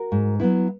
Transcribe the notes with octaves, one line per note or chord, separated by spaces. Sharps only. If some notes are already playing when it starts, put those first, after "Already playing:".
Already playing: F#4 A#4
G#2
F#3 B3 E4